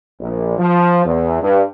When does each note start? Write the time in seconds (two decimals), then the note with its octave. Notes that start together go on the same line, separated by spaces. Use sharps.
0.20 A#1
0.59 F3
1.05 E2
1.42 G2